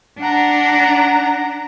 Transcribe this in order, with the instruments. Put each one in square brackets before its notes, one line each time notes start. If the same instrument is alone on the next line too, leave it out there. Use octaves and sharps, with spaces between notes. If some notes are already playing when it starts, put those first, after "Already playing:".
[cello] D4 [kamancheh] F#5 A#5